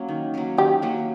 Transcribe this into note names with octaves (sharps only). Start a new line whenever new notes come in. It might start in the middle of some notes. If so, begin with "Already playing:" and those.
Already playing: F#3 A#3 C#4
D#3
F#3 A#3 C#4
D#3 G4
F#3 A#3 C#4